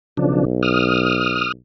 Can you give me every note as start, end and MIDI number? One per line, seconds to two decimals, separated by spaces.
0.17 1.57 35
0.17 0.45 49
0.17 0.45 53
0.17 0.45 62
0.63 1.52 87
0.63 1.52 89